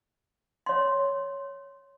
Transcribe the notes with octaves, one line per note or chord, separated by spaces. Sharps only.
C#5 C6